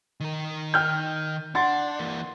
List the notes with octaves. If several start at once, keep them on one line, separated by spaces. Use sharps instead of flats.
D#3 A#4
G5 F6 G6
D4 F#5 C6 A6
E3 A#3